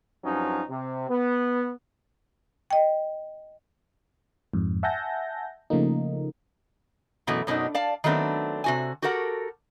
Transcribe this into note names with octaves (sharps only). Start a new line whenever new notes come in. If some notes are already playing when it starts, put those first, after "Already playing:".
G2 F3 F#3 C#4 D#4
C3
B3
D#5 G5
F2 G#2
E5 F#5 G#5 A5 G6 A#6
C#3 F3 A3 A#3 D#4
F#2 B2 E3 A3
F#2 B2 F#3 D4 D#4
D5 F5 A5
D#3 F#3 A3 B3 C4 D4
C3 F#4 G#5
F#4 G4 A4 A#4 F#5